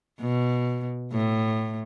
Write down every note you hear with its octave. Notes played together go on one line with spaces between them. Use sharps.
B2
A2